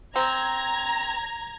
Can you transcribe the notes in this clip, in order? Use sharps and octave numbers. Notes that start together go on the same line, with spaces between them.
C4 A#5 G#6